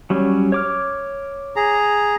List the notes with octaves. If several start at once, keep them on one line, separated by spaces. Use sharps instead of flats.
F#3 G3 C#4
C#5 D6 F6
G#4 A#5